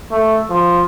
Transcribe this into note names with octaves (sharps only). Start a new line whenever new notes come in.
A3
F3